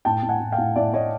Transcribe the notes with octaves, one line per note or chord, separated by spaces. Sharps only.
A2 G5 A5
A2
F#5 G#5
A2
F5 G5
A2
A2 D5 E5
A2 C#5 D#5